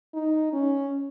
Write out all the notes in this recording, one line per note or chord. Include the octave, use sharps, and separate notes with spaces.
D#4
C#4